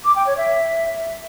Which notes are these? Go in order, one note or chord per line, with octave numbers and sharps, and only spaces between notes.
D6
G5
C#5
E5